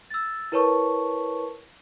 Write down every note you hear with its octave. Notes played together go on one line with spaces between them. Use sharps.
E6 A6
E4 A#4 B4 C#5 A5 C#6